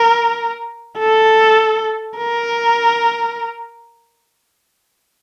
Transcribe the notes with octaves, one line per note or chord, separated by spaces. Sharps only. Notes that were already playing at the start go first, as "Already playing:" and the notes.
Already playing: A#4
A4
A#4